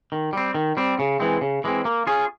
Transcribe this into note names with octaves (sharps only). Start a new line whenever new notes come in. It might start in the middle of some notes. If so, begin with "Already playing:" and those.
D#3
G3 C4
D#3
G3 C4
C#3
E3 G#3 C4
C#3
E3 G#3 C4
A#3
C#4 F4 G#4